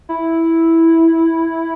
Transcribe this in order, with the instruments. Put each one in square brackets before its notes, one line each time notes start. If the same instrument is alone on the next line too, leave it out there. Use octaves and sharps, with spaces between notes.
[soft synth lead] E4